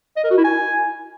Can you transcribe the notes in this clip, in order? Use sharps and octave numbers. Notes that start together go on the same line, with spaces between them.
D#5
A#4
F#4
E4
G#5